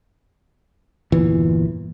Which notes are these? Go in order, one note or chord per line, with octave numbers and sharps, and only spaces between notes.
G1 E2 A#2 E3